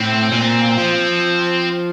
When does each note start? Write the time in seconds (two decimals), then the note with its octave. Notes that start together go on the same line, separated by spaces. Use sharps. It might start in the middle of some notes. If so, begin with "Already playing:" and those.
Already playing: A2 C4
0.32 A#2
0.78 F3